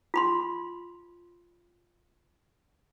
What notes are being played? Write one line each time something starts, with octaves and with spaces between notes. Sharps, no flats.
F4 B5 C6